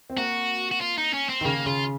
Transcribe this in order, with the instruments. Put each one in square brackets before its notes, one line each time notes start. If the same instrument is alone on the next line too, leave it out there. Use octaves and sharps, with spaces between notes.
[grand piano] C4
[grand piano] A#3 [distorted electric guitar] F#4
[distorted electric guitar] F#4
F4
D#4
C#4
C4
[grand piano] D#3
[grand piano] C#3 [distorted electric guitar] A#3
[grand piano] C#3 [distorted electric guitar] F4